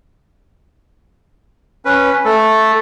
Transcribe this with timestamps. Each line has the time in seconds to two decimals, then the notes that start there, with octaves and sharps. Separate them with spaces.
1.85 C#4 B4
2.25 A3 A4